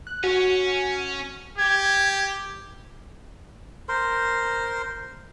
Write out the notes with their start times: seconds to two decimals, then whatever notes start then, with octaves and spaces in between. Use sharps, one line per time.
0.07 F#6
0.24 C#4 F#4
1.58 G4 G#6
3.89 A#4 C5 C6